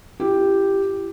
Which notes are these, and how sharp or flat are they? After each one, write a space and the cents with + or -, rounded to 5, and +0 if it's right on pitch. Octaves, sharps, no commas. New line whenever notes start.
E4 +40 G4 +0